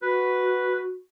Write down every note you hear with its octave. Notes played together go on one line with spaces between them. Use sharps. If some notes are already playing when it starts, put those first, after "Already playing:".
F#4 B4